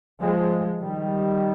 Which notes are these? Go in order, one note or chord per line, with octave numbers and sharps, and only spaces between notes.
F3 G#3
D#3 G3